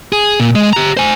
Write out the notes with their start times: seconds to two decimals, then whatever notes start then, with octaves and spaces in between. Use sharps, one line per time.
0.12 G#4
0.40 A#2
0.55 G#3
0.73 G4 A#5
0.97 C5 G#5